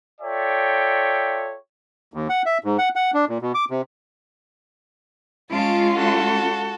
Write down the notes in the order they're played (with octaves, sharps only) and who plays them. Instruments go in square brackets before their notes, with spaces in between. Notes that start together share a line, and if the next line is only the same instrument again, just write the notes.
[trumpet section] F4 A4 C#5 D5 E5 G5
[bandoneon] D#2
F#5
E5
G#2
F#5
F#5
D4
A#2
B2
D6
C3
[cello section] G#3 C#4 F4 [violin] A5 D7
[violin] F#4 A4